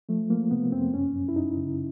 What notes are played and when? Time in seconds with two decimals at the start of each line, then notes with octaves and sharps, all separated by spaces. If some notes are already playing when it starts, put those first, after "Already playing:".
0.09 F3 A3
0.30 F3 A#3
0.51 C3 B3
0.72 F2 C4
0.94 F#2 C#4
1.15 F#2
1.28 E4
1.36 F#2 D#4
1.57 C#3